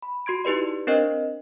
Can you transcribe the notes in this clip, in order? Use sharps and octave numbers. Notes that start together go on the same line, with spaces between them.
B5
F#4 C6 G#6 D7
D#4 E4 G4 B4 D5
C4 D4 A#4 C5 D#5